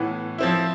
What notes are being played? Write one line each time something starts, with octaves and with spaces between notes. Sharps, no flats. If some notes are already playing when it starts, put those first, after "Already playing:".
Already playing: A2 E3 B3
F3 C4 E4